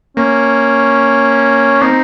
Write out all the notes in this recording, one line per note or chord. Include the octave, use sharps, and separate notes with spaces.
A#3 C#4
C4 D#4